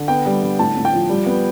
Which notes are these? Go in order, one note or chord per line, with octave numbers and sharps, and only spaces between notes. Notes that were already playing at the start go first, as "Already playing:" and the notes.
Already playing: D3
B3 G5
G3
D3
A2 A5
A2
G5
F3
G3
B3